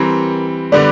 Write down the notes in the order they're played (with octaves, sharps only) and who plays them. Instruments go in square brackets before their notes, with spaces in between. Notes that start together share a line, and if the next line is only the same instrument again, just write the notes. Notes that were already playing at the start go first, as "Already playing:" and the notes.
Already playing: [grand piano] E3 G3 C4 [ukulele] A#4
[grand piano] D3 G3 B3 D4 [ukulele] D5